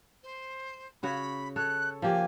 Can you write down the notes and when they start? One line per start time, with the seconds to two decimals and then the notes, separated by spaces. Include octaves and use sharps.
0.23 C5
1.03 C#3 F#4 C#5 B5
1.56 A4 C#5 F#6
2.02 F3 A#3 G4 G#5